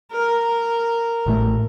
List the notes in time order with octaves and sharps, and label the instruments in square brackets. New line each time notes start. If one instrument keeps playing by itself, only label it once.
[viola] A#4
[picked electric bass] A1 A2 A3